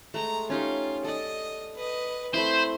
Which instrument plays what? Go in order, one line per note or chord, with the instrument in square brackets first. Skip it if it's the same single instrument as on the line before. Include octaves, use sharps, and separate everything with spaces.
[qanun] G#3 A3 [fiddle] A#5
[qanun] C#4 D#4 G4 [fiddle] F4
[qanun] A4 D5 [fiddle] D#5
[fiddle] B4 D#5
[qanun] A3 C4 E4 [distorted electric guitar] C5 [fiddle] B5